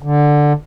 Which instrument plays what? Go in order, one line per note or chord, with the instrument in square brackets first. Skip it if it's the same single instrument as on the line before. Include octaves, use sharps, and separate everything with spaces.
[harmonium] D3